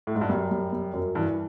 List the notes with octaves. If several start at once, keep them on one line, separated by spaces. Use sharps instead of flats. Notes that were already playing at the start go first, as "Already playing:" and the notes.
A2
G#2
G2
F#2 G3
G3
G3
F#2
G2 E3